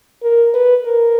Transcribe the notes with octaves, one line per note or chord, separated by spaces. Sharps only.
A#4
B4
A#4